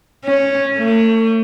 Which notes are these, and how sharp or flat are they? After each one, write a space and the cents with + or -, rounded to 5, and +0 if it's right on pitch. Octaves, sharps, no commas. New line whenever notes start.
C#4 -5
A3 +40